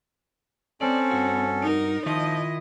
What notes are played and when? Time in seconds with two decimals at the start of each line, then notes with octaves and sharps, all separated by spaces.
0.81 C4 C#4 A4 D5
1.11 G2 F#4
1.62 D#4 A#4
2.06 D#3 F3 E4 F4 D#5